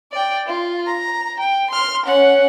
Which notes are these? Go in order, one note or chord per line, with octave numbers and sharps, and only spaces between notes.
D5 G5
F4
A#5
G5
C6 F6
C#4 F#5